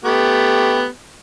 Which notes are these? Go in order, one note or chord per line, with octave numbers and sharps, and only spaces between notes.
A3 B3 G4